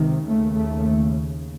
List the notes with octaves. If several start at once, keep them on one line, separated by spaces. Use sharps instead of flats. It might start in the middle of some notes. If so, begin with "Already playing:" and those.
Already playing: C#2 C3 D#3
D#2 C#3 A3
A3